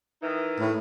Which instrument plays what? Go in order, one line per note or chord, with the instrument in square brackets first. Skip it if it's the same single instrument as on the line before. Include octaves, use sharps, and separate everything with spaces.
[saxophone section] D#3 E3 D#4
[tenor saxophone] A2